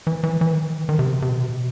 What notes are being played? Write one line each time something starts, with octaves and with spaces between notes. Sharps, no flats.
E3
E3
E3
D#3
D#3
C3
C3
B2